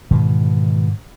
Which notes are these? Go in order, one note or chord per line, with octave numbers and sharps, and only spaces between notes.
G#2 B2 D#3 E3